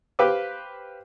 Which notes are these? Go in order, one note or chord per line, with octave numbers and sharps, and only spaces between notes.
G4 B4 C5 F5 G5 D6